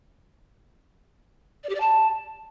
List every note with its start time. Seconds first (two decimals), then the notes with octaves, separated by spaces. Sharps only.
1.64 D5
1.69 G4
1.75 D5
1.80 A5